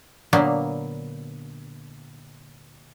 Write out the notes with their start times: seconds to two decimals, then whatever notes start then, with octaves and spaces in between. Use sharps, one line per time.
0.33 A#2 D3 F#3 A#3 B3